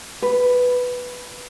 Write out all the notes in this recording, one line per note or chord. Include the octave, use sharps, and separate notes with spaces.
B4